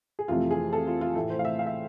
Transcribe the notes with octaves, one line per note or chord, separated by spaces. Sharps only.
G#4
F2 C3 E3 A3 F4
G#4
A4
F4
F4
A2 E3 A3
C5
F5
E5
F5
E5